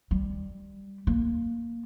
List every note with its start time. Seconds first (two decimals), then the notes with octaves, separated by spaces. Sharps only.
0.11 G3
1.07 A#3